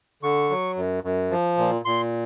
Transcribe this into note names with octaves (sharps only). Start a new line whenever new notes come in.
D3 C#6
F#3
F#2
F#2
F3
A#2
A#2 C6